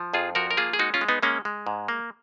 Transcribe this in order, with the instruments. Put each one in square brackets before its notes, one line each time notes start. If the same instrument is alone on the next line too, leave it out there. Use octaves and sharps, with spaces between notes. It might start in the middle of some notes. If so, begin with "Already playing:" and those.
Already playing: [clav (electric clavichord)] F3
F2 F4 G#4
F3 F#4 A#4
A#4
A#3 F4 G#4
G#4
G#3 D#4 F#4
C#4 F4
G#3
B3 D#4
G#3 A#3 C#4
G#3
G#2
A#3